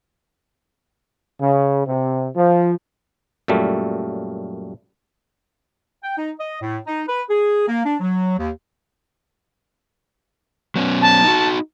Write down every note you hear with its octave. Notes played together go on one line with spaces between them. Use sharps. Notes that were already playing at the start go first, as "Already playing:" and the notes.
C#3
C3
F3
F#2 A#2 G3 A3
G5
D#4
D#5
A2
D#4
B4
G#4
A#3
D4
F#3
D#2
F#3 B3 C#4
A5
D#4 F#4